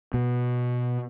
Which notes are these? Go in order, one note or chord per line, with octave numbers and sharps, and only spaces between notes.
B2